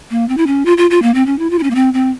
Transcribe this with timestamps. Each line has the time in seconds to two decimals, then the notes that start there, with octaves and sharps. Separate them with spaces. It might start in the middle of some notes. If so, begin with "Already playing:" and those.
0.10 A#3
0.29 C4
0.37 E4
0.47 C#4
0.65 F4
0.77 F4
0.90 F4
1.02 A#3
1.14 C4
1.26 C#4
1.39 E4
1.50 F4
1.59 E4
1.63 C#4
1.71 A#3
1.75 C4
1.94 C4